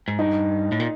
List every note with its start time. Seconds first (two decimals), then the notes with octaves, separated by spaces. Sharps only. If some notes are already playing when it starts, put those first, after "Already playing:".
0.08 G#2
0.19 G2 D#4
0.72 A2
0.80 A#2